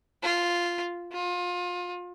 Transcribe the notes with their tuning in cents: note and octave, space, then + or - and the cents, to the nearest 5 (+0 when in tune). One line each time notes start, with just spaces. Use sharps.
F4 -5
F4 +30